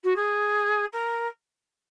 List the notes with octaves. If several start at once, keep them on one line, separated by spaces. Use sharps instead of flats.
F#4
G#4
A#4